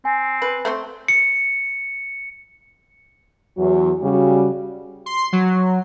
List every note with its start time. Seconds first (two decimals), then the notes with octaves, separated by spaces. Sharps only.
0.05 C4 G#5
0.42 B4
0.65 A3 C4 C5
1.08 C#7
3.57 E2 F#3 F#4
4.02 C#3 G3 F#4
5.06 C6
5.33 F#3